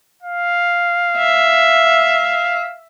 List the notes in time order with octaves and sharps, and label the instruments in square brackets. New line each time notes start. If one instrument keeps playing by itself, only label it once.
[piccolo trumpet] F5
[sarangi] E5